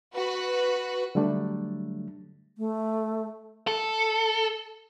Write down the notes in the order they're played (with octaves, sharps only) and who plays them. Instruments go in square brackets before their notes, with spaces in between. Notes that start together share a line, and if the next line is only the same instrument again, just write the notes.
[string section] F#4 B4
[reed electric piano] D3 F#3 G3 A3 D4
[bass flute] A3
[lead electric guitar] A4